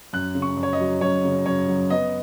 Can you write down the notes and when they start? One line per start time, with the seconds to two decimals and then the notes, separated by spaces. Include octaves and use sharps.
0.13 F#2 F#6
0.35 C#3
0.42 C#6
0.57 F#2
0.63 C#5
0.73 D#5
0.80 F#3
1.01 F#2 C#5
1.24 C#3
1.46 F#2 C#5
1.68 F#3
1.90 B3 D#5